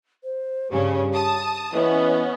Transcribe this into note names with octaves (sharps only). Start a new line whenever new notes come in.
C5
G2 C#3 C#4 G4
A5 D#6
E3 B3 C#4 D#5